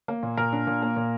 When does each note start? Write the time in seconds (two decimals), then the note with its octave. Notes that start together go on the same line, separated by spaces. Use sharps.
0.08 A#3
0.23 A#2
0.37 A#2 A#4
0.52 D4
0.67 A#2
0.82 A#3
0.96 A#2